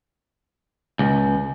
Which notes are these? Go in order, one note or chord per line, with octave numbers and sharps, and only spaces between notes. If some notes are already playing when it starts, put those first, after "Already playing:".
C#2